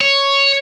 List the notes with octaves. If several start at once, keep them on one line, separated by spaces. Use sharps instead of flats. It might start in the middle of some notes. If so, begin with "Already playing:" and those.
C#5